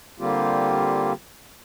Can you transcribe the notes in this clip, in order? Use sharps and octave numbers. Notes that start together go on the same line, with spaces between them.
D3 G3 A#3 C4 F4 G4